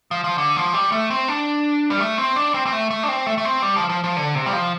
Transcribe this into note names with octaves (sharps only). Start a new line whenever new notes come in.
F3
F3
D3
F3
G3
A3
C4
D4
G3
A3
C4
D4
C4
C4
A3
A3
D4
C4
A3
A3
C4
G3
F3
F3
F3
D3
C3
G3
F3